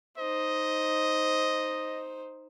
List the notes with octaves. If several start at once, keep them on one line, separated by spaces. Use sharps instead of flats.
D#4 C5 D#5